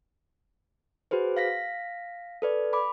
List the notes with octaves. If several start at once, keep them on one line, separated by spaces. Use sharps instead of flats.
F#4 G#4 B4 C5
F5 A#6 B6
A4 B4 D5
B5 D6